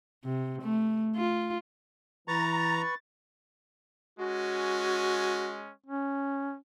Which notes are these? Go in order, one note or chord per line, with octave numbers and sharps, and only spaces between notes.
C3
A3
F4
E3 B4 A#5 C#6 A6
G#3 C#4 F#4
C#4